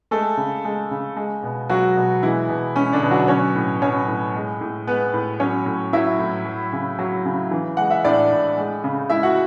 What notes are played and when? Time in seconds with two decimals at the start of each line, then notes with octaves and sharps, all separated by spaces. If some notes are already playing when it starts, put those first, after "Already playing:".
0.11 G#3 A3 A4
0.37 C#3
0.65 G#3
0.91 C#3
1.17 G#3
1.43 B2
1.69 F#3 G#3 F#4
1.97 B2
2.23 E3 G#3 E4
2.49 B2
2.76 G#3 C#4
2.93 D3 D4
3.02 B2
3.11 F#3 F#4
3.28 F#3 C#4 C#5
3.55 A2
3.81 F#3 C#4 C#5
4.08 A2
4.35 G#3
4.61 A2
4.87 G#3 B3 B4
5.14 A2
5.40 F#3 C#4 C#5
5.66 A2
5.93 F#3 E4 E5
6.19 A2
6.45 F#3
6.73 C#3
6.99 F#3
7.25 C#3
7.51 E3
7.77 G#3 F#5
7.90 E5
8.04 A2 D4 D5
8.31 A2
8.57 G#3
8.84 C#3
9.10 G#3 E4 E5
9.23 F#4 F#5